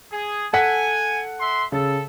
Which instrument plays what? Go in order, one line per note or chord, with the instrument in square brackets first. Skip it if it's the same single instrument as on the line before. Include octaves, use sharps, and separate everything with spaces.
[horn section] G#4
[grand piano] A4 F#5 B6 [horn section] G#5
[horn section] E5 C6
[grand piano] C#3 [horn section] A4